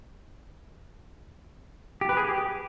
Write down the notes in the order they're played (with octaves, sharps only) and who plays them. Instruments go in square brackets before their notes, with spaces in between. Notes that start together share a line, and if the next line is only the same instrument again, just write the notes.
[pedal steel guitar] G4
B4
G#4
G4